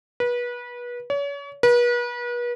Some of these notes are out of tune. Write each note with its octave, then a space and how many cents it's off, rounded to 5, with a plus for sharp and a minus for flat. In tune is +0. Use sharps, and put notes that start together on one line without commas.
B4 -30
C#5 +35
B4 -40